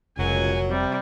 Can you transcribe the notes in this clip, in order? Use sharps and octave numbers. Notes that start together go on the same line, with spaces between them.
F1 C#2 A#2 F#3 G#5
C3 G3